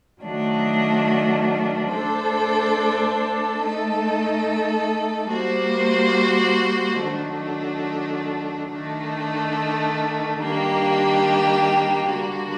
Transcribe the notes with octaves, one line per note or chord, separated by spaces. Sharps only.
D#3 F#3 A3 D4
A3 D4 A4 C5
A3 D#4 A4
G3 A#3 F#4 C5
D#3 F#3 A3 D4
D#3 A3 D4
D#3 G3 A#3 D4 G4
D3 G3 A#3 D4 F#4